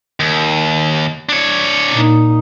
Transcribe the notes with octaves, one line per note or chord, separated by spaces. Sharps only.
D#2
D4 C#5
A#2 D#4